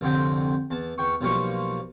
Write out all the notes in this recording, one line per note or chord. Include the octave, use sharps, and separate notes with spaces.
C2 F2 D3 C4 G5
E2 A5
E2 G5 C#6
B1 F3 G3 A#3 F4 C#6